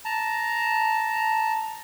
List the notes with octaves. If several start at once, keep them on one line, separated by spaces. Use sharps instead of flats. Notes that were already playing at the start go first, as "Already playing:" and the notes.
A5 A#5